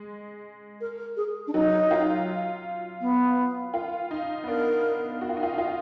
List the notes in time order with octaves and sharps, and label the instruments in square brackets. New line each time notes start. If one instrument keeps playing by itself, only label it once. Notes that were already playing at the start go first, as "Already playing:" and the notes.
Already playing: [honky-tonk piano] G#3
[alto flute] A#4
A#4
G#4
D4
[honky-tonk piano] F#3 [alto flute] D#4
[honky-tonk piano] F4
[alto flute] B3
[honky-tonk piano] F4
D#4
B3
[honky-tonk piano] D4 [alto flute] A#4
[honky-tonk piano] F#4
F4
D#4
F4
F4